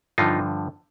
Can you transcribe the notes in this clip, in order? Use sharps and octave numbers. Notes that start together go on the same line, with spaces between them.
G2 D3 F3 D#4 F4